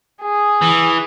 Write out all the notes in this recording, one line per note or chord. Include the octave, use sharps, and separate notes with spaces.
G#4
E3